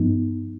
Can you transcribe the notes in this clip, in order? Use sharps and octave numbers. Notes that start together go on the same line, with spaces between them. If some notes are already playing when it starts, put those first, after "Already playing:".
Already playing: G2 F3 B3 D#4